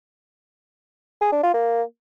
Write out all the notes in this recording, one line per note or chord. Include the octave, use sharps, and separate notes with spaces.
G#4
D4
F4
A#3